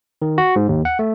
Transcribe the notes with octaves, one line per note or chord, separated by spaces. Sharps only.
D#3
F#4
G#2
D#2
F#5
A3